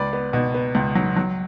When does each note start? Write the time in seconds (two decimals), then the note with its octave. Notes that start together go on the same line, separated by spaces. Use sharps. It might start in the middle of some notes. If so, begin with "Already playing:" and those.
Already playing: C#2 B4 D5
0.13 B3
0.33 B2
0.54 B3
0.75 C#2
0.95 F#3
1.16 F#3